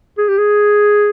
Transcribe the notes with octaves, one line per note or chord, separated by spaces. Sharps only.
G#4
G4
G#4